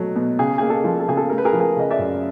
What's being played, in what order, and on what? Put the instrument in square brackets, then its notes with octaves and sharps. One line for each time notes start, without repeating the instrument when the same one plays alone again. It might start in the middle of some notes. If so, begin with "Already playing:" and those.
Already playing: [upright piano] B2 F#3 A3
B2
C#3 G#4
A#3 G#4
A4
F3
A4
C#3 G#4
A4
A3 A#4
B4
G#4 A#4
F3
G#4 A#4
C#3 D#5
D5 E5
F#2